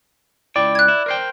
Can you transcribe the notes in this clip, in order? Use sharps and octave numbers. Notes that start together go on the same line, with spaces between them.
C#2 E4 D5 G5
F#6 G#6
E4
A#4 C5 G5